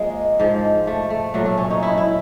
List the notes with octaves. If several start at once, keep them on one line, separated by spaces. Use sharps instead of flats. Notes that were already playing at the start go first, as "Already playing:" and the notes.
Already playing: F3 G#3 A#3
G#2 F3
A3
A3
A#2 F#3 A3
A3
C#4
D#4
E4
E4